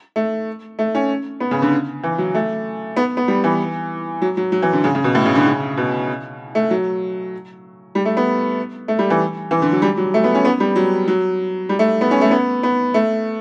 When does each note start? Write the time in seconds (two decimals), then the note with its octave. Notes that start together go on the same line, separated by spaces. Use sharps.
0.16 A3
0.79 A3
0.95 C#4
1.40 B3
1.51 C#3
1.62 D3
2.03 E3
2.18 F#3
2.35 A3
2.97 B3
3.17 B3
3.28 G3
3.44 E3
4.22 F#3
4.37 F#3
4.52 F#3
4.62 E3
4.73 D3
4.84 C#3
4.95 C#3
5.04 B2
5.15 A2
5.26 C#3
5.35 D3
5.47 C#3
5.77 B2
6.55 A3
6.70 F#3
7.95 G3
8.05 A3
8.17 B3
8.88 A3
8.99 G3
9.10 E3
9.51 E3
9.62 D3
9.72 F#3
9.82 G3
9.97 F#3
10.14 A3
10.24 B3
10.35 C#4
10.45 B3
10.60 G3
10.76 F#3
11.08 F#3
11.69 G3
11.79 A3
12.01 B3
12.11 C#4
12.21 A3
12.31 B3
12.63 B3
12.94 A3